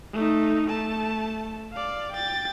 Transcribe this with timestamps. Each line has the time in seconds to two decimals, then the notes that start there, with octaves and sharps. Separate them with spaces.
0.13 A3 D#4
0.67 A3 A5
1.73 D5 F5
2.12 G5 A6